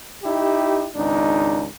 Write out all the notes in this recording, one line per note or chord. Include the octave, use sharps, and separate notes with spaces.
D#4 E4 G4
G#1 C#2 D4 D#4